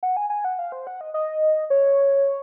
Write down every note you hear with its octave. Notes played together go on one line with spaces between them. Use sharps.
F#5
G#5
G#5
F#5
F5
C5
F#5
D#5
D#5
C#5